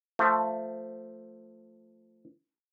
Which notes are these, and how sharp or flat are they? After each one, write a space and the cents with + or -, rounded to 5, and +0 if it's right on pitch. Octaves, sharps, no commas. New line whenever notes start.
F3 +0 A3 +15